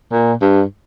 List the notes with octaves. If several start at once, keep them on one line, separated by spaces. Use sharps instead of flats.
A#2
G2